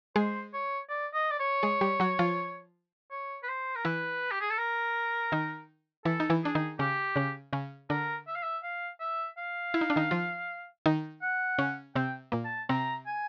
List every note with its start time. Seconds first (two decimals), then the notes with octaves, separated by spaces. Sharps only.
0.16 G#3 G#4 C5
0.53 C#5
0.89 D5
1.14 D#5
1.31 D5
1.39 C#5
1.63 G#3 G#4
1.81 G3 G4
2.00 F#3 F#4
2.19 F3 F4
3.11 C#5
3.43 B4
3.48 C5
3.75 A#4
3.85 E3 E4 B4
4.31 G4
4.41 G#4
4.50 A4
4.58 A#4
5.32 D#3 D#4
6.05 E3 E4 A4
6.20 D#4
6.30 E3 E4
6.43 D4 G#4
6.55 D#3 D#4
6.79 C#3 C#4 G4
7.16 C#3 C#4
7.53 C#3 C#4
7.90 D3 D4 A#4
8.27 E5
8.36 F5
8.43 E5
8.63 F5
9.00 E5
9.38 F5
9.74 E4
9.81 D#4
9.90 D4
9.96 D#3 D#4
10.11 F3 F4
10.86 D#3 D#4
11.22 F#5
11.59 C#3 C#4
11.96 C3 C4 G5
12.32 A#2 A#3
12.45 A5
12.69 C3 C4 A#5
13.06 G#5